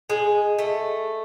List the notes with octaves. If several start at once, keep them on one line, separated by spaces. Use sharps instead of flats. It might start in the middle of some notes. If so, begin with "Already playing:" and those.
G#3
A3